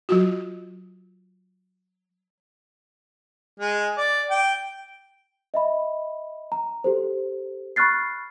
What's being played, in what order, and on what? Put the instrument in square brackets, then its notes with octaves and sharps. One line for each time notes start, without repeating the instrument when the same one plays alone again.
[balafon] F#3 F4 F#4
[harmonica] G#3
D5
G5
[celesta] D#5 E5 B5
A#5
G4 A4 C5
B5 C#6 F6 F#6 A6 C7